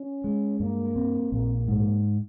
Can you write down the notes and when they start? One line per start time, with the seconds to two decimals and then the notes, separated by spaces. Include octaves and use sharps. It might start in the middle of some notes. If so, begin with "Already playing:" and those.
Already playing: C#4
0.24 G#3
0.60 G2 A#3
0.96 C4
1.32 A#1 A#3
1.68 G#2